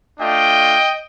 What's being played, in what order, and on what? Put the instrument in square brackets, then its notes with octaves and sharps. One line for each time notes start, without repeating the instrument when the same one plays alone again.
[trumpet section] A3 D4 F4 D#5 G5